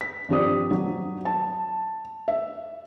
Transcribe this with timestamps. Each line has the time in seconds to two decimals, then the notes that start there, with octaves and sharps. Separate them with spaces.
0.01 B6
0.29 G2 F3 C4 G4 D5 D#6
0.71 F#3
1.25 A5
2.28 E5